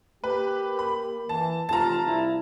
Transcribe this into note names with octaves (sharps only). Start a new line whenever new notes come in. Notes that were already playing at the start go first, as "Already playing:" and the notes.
A#3 G4 B4
B5
E3 A5
F1 F4 A5 A#5
C2 E4